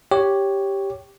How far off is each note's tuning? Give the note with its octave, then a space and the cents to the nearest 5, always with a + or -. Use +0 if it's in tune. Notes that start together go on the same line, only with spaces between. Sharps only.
G4 +0 C#5 +0